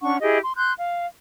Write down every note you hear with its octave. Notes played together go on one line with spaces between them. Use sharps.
C#4 D4 F#5 C#6
E4 G4 G#4 D#5
C6
C6 F#6 G6
F5